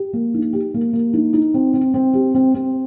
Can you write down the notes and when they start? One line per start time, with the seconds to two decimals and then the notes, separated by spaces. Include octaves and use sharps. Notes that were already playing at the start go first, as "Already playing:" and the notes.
Already playing: G4
0.13 A#3
0.34 D#4
0.53 G4
0.74 A#3
0.93 A#3
1.14 D#4
1.33 D#4
1.54 C4
1.74 C4
1.94 C4
2.14 G4
2.34 C4
2.54 C4